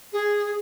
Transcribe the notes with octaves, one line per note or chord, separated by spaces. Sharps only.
G#4